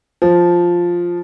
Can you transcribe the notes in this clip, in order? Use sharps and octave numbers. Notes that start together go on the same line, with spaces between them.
F3